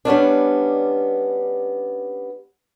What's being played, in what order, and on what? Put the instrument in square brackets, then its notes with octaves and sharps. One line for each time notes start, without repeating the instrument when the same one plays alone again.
[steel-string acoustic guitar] G3 B3 C#4 D4